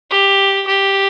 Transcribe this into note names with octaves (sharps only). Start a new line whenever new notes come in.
G4
G4